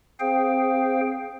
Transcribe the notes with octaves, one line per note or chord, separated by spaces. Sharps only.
C4 G#4 C5 F5 G5